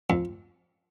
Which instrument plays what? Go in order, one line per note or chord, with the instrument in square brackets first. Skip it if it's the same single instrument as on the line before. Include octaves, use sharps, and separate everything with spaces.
[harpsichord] F2